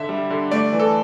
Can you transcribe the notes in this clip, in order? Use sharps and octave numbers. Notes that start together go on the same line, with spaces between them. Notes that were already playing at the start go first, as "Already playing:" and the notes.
Already playing: D3 E5
G3
D3
A3 D5
E3
A4